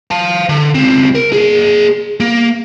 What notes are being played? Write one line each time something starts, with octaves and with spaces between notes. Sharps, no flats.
F5 A5
D3
C#2 C4
A#4
A#3 G#4
A#3